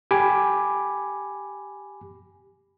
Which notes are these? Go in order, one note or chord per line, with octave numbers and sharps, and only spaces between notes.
G4 G#5 B5 D6